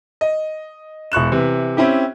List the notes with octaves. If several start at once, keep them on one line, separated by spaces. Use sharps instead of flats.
D#5
E1 C#6 F#6 E7
C3 E3
C4 C#4 E4 G4